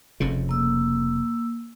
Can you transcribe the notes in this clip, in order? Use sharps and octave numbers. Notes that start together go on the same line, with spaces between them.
F1 F2 C#3
A#3 E6